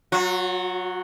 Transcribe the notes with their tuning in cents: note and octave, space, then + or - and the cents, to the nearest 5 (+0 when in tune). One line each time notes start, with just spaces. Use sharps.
F#3 +0 F#4 -45